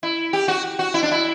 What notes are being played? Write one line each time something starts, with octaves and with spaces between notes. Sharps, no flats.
E4
G4
F#4
F#4
E4
D4
E4